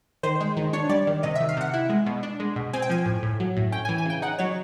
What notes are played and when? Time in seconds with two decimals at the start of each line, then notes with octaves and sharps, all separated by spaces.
0.23 D#3 C5
0.40 G#3
0.57 D#3
0.73 D4 C#5
0.89 G3 D5
1.07 D#3
1.23 C3 D#5
1.35 D#3 E5
1.49 F5
1.57 C3 F#5
1.74 E4
1.89 G#3
2.06 B2
2.23 D4
2.40 G#3
2.56 B2
2.73 C4 G#5
2.82 G5
2.90 F3 G#5
3.06 A2
3.22 A2
3.40 F#3
3.57 A2
3.72 C#4 G5
3.85 E3 G#5
3.98 G#5
4.05 C#3 G5
4.22 D#4 F#5
4.39 F#3 C#5